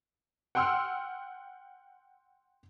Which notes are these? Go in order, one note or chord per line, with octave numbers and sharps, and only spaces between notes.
F#5 G5 C6 E6 F6